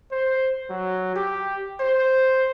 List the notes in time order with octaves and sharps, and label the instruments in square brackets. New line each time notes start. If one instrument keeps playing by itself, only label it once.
[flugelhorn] C5
F#3
G4
C5